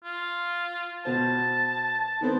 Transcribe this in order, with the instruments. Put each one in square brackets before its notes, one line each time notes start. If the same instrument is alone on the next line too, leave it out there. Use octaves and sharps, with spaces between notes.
[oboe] F4
[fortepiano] B2 C5 [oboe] A5
[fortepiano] D#3 B3 C4